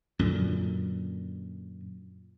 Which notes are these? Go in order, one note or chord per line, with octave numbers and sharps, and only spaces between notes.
F#2 A#2 D3